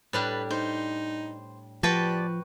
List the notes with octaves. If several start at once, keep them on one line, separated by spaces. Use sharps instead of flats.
A2 G3 D4 B4
D#4 C5
F3 F#4 G4 B4 D5 G5 A5